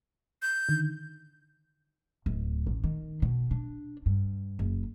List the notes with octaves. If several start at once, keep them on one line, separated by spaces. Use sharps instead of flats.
G6
D3 D#3
D1
A1
D#3
B2
D4
G2
F#1